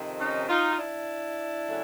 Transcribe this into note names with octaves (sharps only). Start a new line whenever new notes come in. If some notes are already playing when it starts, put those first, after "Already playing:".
Already playing: F2 C3 D#3
C#4 D#4
D#4 F4
F4
D4 E4
C#3 F#3 A3